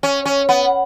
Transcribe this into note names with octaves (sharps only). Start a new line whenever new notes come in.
C#4
C#4
B3